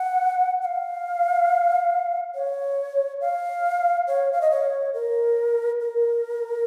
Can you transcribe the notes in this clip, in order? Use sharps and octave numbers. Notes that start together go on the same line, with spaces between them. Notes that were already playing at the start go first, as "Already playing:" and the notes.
Already playing: F#5
F#5
F5
C#5
F5
C#5
F5
D#5
C#5
A#4
A#4